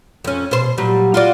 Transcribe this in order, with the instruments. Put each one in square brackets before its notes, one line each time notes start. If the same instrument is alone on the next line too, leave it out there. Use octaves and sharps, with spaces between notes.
[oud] F2 C#4
B2 C5
A#2 F#3 G3
F4 F#4 D5